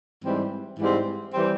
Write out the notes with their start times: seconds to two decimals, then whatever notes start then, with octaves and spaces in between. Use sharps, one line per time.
0.23 G#2 E3 G3 C4
0.78 G#2 E3 G3 C4
1.33 E3 G3 C4